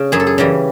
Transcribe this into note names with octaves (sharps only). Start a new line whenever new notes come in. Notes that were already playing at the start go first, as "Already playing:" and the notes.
Already playing: C#3
F#2 G#4
A4
G#4
C#3 E3 G3